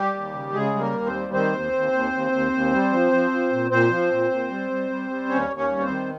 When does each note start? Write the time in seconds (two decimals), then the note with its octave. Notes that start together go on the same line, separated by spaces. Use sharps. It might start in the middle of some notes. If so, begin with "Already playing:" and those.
Already playing: G3 G4
0.14 D#2
0.34 C#3
0.53 C#3 G#3 G#4
0.74 G3
0.80 A#3 A#4
0.93 D#2
1.06 C4 C5
1.13 G3
1.33 D#3 C4 C5
1.53 D#2
1.73 D#2
1.92 D#2
2.13 D#2
2.32 D#2
2.53 D#2
2.72 G3
2.92 F3
3.12 F3
3.31 F3
3.52 A#2
3.71 A#2 C4 C5
3.91 F3
4.11 A#2
4.31 A#2
4.50 G3
4.70 G3
4.90 G3
5.10 G3
5.29 D#2 C#4 C#5
5.49 D#2
5.56 C#4 C#5
5.70 G3
5.82 C4 C5
5.89 D#3